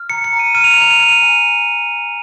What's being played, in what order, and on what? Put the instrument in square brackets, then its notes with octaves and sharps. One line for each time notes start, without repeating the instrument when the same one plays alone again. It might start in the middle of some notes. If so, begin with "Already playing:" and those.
Already playing: [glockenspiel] F6
A#5 C#7
C#7
A#5
D#7
F6 D#7
F7
D#7
A#5 F7
D#7
F6 F7
D#7
F7
G#5